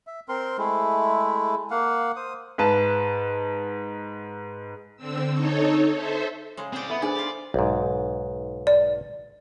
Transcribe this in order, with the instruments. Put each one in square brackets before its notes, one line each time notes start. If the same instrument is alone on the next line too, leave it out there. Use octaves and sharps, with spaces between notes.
[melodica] E5
C4 A#4 C6
G#3 A3 E4
A#3 F5 F#5
C5 D#6
[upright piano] G#2 B4 A5
[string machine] D3 C4 E6
D#4 A4 C#5
A4 C5 E5
[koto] C#3 G#3
[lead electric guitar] C4 D5 [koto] G#4 G5
[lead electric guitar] B3 [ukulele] E4 E5 B5 [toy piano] A4
[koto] B3 [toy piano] D4 A4 C5 [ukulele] G#4 B4 G#5 [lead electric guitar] D5
[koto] F4 G4
[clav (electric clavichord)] B1 G#2
[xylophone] D5